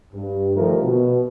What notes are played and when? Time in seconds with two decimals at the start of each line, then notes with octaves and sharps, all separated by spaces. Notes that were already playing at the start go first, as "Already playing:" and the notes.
0.13 G2
0.54 D3 D#3 F3 G3 A3 A#4
0.83 B2